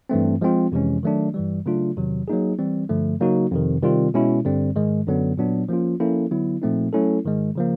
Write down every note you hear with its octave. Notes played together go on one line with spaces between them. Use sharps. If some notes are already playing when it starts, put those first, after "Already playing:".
G2 E3 A3 C4
F3 G#3 C4 F4
F2 C3 E3 G#3 C#4
D#3 F#3 A3 D4
G2 E3 G3
C#3 F#3 A3 D4 F4
E2 C3 D#3 F#3
F#3 A#3 D#4 G#4
E3 G3 C4
G2 D3 F3 A3
C#3 F#3 A#3 D#4 F#4
F2 C3 D#3
C3 D#3 G3 C4 F4
B2 G#3 C#4 E4
G2 D3 G3 C4
G#2 D#3 G#3
F#2 D3 F#3 B3
A#2 F#3 B3 D4
F3 A#3 C#4 F4
F3 A#3 C#4 E4 A4
D3 F#3 B3 E4
A#2 F3 A3 C4 D#4
F#3 A3 C#4 E4 A4
G#2 D#3 G#3
C#3 F3 A#3